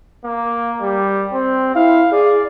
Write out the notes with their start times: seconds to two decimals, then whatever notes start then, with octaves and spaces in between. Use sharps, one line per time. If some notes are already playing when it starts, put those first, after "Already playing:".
0.25 A#3
0.81 G3
1.33 C4
1.75 E4 F5
2.12 G#4 D5